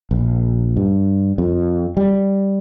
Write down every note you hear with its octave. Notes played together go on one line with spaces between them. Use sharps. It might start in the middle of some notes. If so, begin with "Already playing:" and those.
A#1
G2
F2
G3